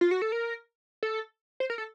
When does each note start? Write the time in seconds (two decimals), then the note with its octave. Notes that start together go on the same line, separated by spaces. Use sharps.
0.01 F4
0.11 F#4
0.22 A4
0.32 A#4
1.03 A4
1.60 C5
1.70 A#4
1.78 A4